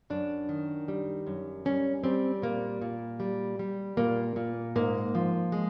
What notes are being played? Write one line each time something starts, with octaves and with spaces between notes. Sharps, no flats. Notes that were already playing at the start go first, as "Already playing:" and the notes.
F#2 D4
D#3
G3
F#2
G3 C#4
G3 C4
A#2 A#3
A#2
G3
G3
A#2 A#3
A#2
G#2 A#3
F3
G#3